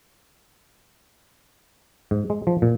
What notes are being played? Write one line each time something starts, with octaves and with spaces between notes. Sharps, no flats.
G#2
G#3
F3
A#2